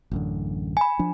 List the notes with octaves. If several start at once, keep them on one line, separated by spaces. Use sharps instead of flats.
A1 F#2 D3
G#5 B5
F3 D4